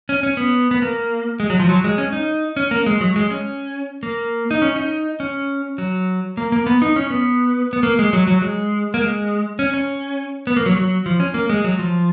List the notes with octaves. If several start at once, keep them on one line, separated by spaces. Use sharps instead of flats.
C#4
C#4
B3
B3
A#3
G#3
F#3
F3
F#3
G#3
C#4
D#4
C#4
A#3
G#3
F#3
G#3
C#4
A#3
D#4
C#4
D#4
C#4
F#3
A#3
A#3
B3
D#4
C#4
B3
B3
A#3
G#3
F#3
F#3
G#3
A#3
G#3
C#4
C#4
B3
A#3
F#3
F#3
F3
C#4
A#3
G#3
F#3
F3